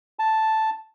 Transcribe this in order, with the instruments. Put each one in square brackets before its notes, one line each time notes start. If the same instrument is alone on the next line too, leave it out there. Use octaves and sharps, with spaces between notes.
[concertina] A5